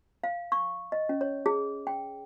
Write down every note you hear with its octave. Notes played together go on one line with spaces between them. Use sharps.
F5
C#6
D#5
C#4
C#5
G#4
G5